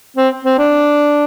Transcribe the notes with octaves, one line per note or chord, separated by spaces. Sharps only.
C4
C4
D4